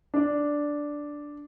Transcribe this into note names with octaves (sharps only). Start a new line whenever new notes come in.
D4 D5